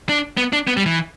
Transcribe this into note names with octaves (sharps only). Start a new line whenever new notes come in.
D4
B3
D4
B3
G3
E3